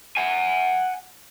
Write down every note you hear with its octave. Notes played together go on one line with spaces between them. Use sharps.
F#5 G#5